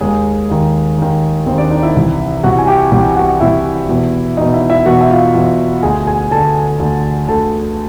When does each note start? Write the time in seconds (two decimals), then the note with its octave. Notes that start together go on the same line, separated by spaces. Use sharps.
0.01 D#2 D#3 G#3 G#4
0.50 D#2 D#3
0.98 D#2 D#3
1.46 D#2 D#3 C4 C5
1.58 D4 D5
1.70 D#4 D#5
1.83 E4 E5
1.95 C2 C3 E3
2.43 C2 C3 E3 F#4 F#5
2.58 G#5
2.67 G4 G5
2.92 C2 C3 E3 G4 G5
3.16 F#4 F#5
3.40 C2 C3 E3 E4 E5
3.89 E2 B2
4.37 E2 B2 D#4 D#5
4.54 E4 E5
4.70 E4 E5
4.86 E2 B2 F#4 F#5
5.01 E5
5.10 F4 F5
5.34 E2 B2 F4 F5
5.83 D2 D3 G#4 G#5
6.07 G#4 G#5
6.31 D2 D3 A4 A5
6.79 D2 D3
7.28 D2 D3 A4 A5